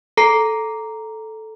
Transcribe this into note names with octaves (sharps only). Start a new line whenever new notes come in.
A4 A#5 C7